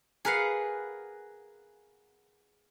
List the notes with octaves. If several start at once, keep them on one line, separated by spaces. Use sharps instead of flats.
G#4 A#4 B4 F5 F#5